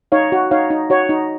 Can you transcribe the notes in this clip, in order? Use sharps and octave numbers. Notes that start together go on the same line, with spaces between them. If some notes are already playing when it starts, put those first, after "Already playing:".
D#4 C#5 F5
F#4
D#4 C#5 F5
D#4
F#4 C#5
D#4